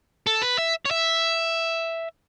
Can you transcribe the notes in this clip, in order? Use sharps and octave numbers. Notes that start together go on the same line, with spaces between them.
A4
B4
E5
C#5
E5